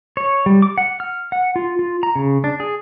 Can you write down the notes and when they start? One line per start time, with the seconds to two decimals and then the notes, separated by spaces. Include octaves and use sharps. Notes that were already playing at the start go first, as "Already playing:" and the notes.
0.17 C#5
0.46 G3
0.62 D6
0.78 F#5
1.00 F6
1.32 F#5
1.56 F4
1.79 F4
2.03 A#5
2.15 C#3
2.44 D4
2.60 G#4